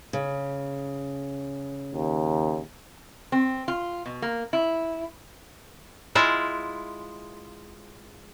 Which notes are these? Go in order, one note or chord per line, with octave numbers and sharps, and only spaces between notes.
C#3
D#2
C4
F4
B2
A#3
E4
G#3 E4 F4